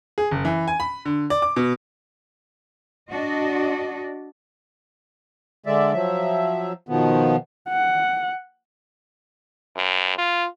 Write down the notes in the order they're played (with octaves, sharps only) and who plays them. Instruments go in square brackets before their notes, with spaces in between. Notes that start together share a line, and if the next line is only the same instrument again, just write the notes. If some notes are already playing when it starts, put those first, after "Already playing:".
[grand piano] G#4
F#1
E3
G#5
B5
D3
D5
D6
B2
[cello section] D4 F#4 D#5
[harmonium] D3 G#3 D5 E5
F3 F#3 E5
B2 D#3 F3 B3
[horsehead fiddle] F#5
[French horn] F#2
F4